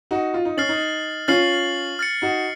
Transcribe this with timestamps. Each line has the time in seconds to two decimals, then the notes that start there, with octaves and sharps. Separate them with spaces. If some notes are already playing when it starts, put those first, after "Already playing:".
0.11 D#4 F#4
0.34 F4
0.45 D#4
0.57 C#4 F6 A6 C7 F#7
0.69 D#4
1.28 C#4 F4 F6 A6 C7 F#7
1.99 F6 A6 C#7
2.22 D#4 F#4